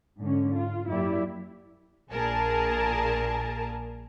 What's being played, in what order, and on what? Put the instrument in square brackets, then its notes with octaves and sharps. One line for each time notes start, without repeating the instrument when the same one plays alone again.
[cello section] G#2 D3 C#4
F4
F#2 A#3 E4 G4 D5
[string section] A#1 A#2 G#4 A#4 A5